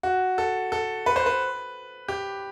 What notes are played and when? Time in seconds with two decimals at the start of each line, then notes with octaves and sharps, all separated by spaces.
0.03 F#4
0.38 A4
0.72 A4
1.06 B4
1.16 C5
1.26 B4
2.08 G4